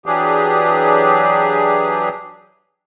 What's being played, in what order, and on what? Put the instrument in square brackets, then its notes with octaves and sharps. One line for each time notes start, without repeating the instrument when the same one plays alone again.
[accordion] E3 F#3 D4 G4 G#4